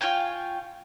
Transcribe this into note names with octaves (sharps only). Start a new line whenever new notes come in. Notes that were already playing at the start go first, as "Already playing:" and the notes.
F4 C#5 G5 G#5